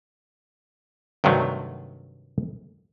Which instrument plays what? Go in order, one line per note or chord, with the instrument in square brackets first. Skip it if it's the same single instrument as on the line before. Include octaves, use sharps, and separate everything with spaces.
[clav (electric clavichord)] G2 C3 D#3 F#3 A3